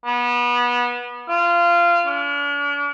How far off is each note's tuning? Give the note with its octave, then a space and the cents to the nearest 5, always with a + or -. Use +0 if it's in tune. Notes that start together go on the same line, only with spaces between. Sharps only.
B3 -25
F4 -20
D4 -45